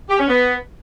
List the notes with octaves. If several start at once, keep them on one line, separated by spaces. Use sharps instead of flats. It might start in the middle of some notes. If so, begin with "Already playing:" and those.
G4
C#4
B3